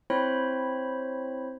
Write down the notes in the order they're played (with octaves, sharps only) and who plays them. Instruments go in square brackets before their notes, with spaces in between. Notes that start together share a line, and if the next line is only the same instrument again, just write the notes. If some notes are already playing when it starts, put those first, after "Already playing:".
[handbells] C4 E4 C5 C#5 B5